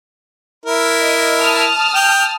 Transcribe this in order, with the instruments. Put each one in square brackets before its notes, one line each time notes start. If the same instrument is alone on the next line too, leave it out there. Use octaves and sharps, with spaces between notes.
[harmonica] E4 A#4
[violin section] D#5
A5 D#6 F6
[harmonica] G5